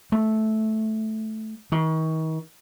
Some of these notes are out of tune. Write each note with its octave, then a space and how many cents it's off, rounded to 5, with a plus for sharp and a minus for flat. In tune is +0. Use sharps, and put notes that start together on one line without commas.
A3 -10
D#3 +40